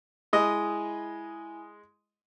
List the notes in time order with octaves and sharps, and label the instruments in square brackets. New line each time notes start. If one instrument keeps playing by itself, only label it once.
[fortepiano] G#3 D#5 [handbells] E4 G#5